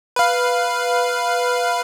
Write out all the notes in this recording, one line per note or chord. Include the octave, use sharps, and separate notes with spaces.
B4 F5